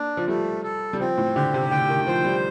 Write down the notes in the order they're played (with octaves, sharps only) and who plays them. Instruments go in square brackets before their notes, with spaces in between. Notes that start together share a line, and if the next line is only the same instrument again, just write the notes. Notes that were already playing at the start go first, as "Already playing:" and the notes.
Already playing: [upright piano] A#3 [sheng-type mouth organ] D4
[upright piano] F3
[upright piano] G3 [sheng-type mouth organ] A3
[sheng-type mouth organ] A4
[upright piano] G3
[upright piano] F3 [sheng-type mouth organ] C4
[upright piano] A2
[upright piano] D3 [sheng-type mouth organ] G4
[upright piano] C3
[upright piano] D3 [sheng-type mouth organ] G5
[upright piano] D#3
[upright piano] F3 [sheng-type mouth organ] C5
[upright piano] G3